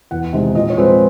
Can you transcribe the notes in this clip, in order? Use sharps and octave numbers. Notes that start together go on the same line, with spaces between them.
E2 F#5
C3 D#3 G#3
A#2 D#5
C#5
F3 G#3 C4 B4
C5